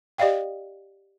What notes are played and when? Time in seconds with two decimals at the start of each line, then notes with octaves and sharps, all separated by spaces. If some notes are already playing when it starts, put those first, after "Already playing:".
0.18 G4 D5 D#5 F5 G5